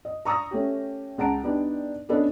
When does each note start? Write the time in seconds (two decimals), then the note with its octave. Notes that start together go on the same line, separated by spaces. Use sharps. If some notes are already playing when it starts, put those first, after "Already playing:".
0.05 D#5
0.25 A#5 C#6 D#6 E6 A#6
0.51 A3 C#4 G4
1.18 C#2 F#5 A5 A#5 D7
1.44 B3 D4 D#4 G4
2.09 B3 C#4 D4 A4 B4 D#5